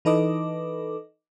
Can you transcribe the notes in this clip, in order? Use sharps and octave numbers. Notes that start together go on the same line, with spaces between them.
E3 D#4 A4 B4 D#5 D6